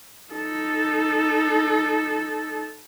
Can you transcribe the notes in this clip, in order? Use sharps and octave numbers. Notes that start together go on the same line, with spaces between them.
D#4 A4